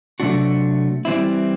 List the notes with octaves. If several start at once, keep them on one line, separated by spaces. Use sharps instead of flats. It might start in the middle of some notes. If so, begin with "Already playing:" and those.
C3 F#3 A3 D4 F#4
E3 G3 C4 E4